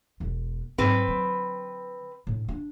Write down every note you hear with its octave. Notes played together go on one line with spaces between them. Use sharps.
E1 B3
G#2 F#3 C4 B4
D3 F#3
A2 D3
D4